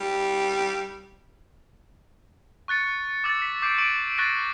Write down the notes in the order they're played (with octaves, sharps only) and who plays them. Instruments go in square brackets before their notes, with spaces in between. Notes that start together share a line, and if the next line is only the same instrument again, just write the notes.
[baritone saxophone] G3
[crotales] C#6 F#6 A6 C#7
D6 E6 A6
B6
D6 G6 C7 D7
C#6 D7 D#7 F#7
C#6 F#6 A6 A#6 C7